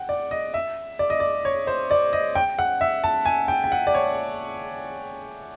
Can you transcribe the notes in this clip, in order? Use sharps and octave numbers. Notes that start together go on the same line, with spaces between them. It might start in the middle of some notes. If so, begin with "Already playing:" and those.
Already playing: F#5 G5
D5
D#5
E5
D5
D#5
D5
C#5
C5
D5
D#5
G5
F#5
E5
A5
G#5
G5
G5
F#5
D5
C#5